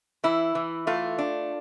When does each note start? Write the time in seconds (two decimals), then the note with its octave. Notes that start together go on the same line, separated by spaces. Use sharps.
0.24 E3 E4
0.55 E3
0.87 A3 F4
1.18 D4